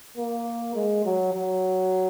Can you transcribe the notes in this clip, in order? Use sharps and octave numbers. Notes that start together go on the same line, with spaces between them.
A#3
G#3
F#3
F#3